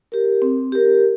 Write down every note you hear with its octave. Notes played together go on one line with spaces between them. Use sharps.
G4 A#4
C4
G4 A#4